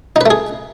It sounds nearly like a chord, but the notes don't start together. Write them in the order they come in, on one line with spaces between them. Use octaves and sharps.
D#4 B4 A3 G#4